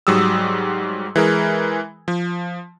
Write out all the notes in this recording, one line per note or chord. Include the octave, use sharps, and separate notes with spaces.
G#2 F#3 G3 D#6 E6
E3 G#3 A#4
F3